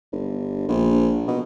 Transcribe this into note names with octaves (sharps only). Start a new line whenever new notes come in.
G1
A#1
B2